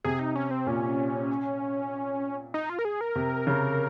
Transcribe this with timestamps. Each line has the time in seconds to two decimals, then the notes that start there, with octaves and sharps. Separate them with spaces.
0.04 C3 G#4
0.19 D#4
0.35 C#4
0.51 C4
0.66 A#2 C#4
2.54 D#4
2.70 F4
2.79 A#4
2.85 G#4
3.01 A#4
3.16 C3
3.47 C#3